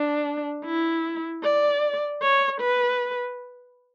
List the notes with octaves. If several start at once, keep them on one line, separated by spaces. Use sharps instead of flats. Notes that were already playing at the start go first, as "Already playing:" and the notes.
Already playing: D4
E4
D5
C#5
B4